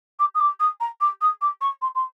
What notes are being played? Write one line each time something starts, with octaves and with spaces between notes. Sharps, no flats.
D6
D#6
D6
D#6
A#5
D6
D#6
D6
C#6
C6
C6